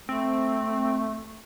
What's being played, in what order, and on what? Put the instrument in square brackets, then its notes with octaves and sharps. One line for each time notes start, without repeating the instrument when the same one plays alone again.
[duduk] A3 [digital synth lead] C4